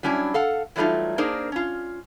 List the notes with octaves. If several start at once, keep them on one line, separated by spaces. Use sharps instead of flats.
F#3 G3 C#4 D4 E4
A4 F5 F#5
E3 F#3 G3 A3 D#4 F4
A#3 D4 D#4 G#4 A#4 C5
C#4 F4